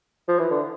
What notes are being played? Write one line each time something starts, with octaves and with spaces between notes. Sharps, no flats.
F3
E3
D3